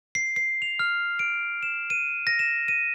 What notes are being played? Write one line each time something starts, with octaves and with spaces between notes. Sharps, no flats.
C7
C7
F7
F6
D7
E7
D#7
A#6
E7
D#7